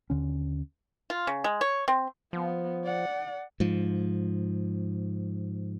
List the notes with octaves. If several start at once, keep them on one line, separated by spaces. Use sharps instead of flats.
D#2 D3 C#4
F4
C#3
G#3
C#5
C4
F3 B3
D5 F#5
G#2 F3